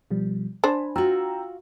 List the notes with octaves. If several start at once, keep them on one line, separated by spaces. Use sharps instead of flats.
B2 F3 G3
D4 C5 G#5 B5
F4 F#4 G5 A#5 E6